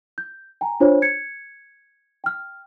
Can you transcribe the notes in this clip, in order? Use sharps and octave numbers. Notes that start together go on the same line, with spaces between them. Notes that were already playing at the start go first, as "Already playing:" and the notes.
G6
G5 G#5 A#5
D4 F4 C5 C#5
G#6 C#7
G5 F6